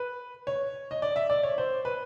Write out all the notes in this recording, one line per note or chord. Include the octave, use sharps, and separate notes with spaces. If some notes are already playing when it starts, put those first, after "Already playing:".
Already playing: B4
C#5
D#5
D5
E5
D5
C#5
C5
B4